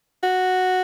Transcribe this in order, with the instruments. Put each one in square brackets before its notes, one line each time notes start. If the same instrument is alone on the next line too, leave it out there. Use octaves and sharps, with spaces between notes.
[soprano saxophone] F#4